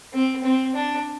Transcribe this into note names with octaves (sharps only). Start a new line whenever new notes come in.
C4
C4
D4